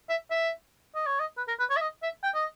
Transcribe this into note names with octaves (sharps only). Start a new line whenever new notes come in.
E5
E5
D#5
C#5
D#5
B4
A#4
B4
C#5
E5
D#5
E5
G5
D#5